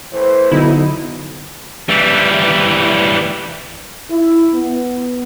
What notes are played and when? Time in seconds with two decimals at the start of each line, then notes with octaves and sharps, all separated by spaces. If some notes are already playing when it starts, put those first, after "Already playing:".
0.13 A2 E3 C5
0.52 B1 D3 D#4 E4
1.89 E3 G3
4.11 E4
4.54 B3